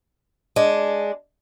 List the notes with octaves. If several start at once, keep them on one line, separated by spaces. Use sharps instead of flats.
G#3 D4